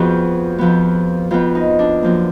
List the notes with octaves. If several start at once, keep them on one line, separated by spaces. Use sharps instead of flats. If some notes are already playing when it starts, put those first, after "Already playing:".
Already playing: F2 F3 B3 F#4 G#4
F2 F3 B3
F2 F3 B3 F4
D#4
D4
F#2 F3 A#3